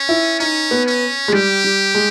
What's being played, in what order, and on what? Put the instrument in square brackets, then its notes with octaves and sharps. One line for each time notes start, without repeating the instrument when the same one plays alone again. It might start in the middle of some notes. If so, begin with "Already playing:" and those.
Already playing: [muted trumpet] C#4
[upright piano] E4
[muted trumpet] C#4 [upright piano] D#4
[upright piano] B3
[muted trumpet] C#4
[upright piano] G#3
[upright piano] G3 [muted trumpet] G4
[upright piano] G3
G#3